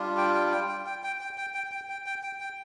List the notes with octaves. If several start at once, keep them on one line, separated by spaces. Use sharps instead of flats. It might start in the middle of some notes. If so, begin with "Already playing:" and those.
Already playing: G3 D4 F4
G5
G5
G5
G5
G5
G5
G5
G5
G5
G5
G5
G5
G5
G5